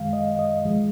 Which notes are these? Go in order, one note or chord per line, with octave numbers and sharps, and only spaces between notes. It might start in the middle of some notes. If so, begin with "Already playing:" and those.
Already playing: F#2 D#3 G#3 F5
D#5
D#5
G#2 F3 G#3